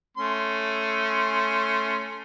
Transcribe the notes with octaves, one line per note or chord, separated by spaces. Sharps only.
A3 C#4 C6